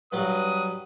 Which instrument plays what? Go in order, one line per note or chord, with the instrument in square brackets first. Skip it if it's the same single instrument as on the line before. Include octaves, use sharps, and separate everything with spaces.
[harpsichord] G2 F#3 [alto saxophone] B4 [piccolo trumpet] D#6